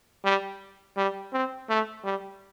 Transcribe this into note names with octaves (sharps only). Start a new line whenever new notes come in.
G3
G3
C4
A3
G3